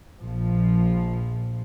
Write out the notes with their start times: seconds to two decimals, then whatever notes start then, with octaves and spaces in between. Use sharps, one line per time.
0.21 A#1 F3